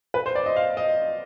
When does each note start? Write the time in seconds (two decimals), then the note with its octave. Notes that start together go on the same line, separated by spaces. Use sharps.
0.14 B4
0.26 C5
0.35 D5
0.46 D#5
0.56 F5
0.77 D#5